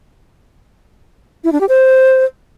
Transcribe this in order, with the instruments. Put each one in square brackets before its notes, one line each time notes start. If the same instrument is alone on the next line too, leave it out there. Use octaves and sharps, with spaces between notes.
[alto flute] E4
D4
G4
C5